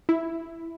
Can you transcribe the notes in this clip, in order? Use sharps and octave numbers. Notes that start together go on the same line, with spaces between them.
E4